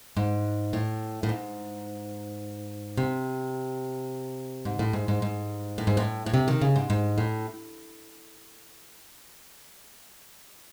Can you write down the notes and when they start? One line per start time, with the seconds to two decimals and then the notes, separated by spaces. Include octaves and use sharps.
0.17 G#2
0.73 A2
1.23 A2
1.29 G#2
2.97 C3
4.65 G#2
4.79 A2
4.93 G#2
5.08 G#2
5.22 G#2
5.78 A2
5.87 G#2
5.97 A2
6.26 A2
6.34 C3
6.48 D#3
6.61 C#3
6.76 G#2
6.90 G#2
7.18 A2